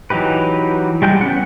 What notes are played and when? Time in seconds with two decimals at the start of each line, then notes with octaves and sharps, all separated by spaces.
0.10 E3 F#3 D#4 G4 B4
1.02 G3 G#3 G5 G#5 G6
1.21 B3 C#4 F#5